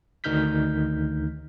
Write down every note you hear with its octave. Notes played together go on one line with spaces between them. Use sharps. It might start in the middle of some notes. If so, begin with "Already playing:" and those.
D2 D#3 D#4 F6 G6 B6